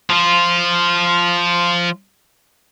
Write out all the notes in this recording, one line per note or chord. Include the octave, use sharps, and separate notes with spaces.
F3 F4